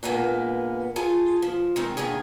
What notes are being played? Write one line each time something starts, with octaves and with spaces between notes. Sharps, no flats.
G2 A#2 G#3 A#3 B3
F4 G#4 A4
F3
D#3 G#3 C4
D#2 D3 D#3 G#4